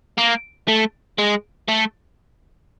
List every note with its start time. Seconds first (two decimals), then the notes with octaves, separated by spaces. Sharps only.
0.18 A#3
0.68 A3
1.19 G#3
1.69 A3